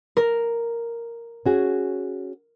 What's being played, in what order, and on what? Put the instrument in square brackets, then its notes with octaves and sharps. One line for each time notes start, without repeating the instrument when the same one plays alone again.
[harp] A#4
[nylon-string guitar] C#4 F#4 G#4